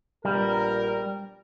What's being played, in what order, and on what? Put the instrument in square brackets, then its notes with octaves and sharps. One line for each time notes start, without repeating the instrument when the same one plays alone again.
[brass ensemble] A#1 B3 A#4 [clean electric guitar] G3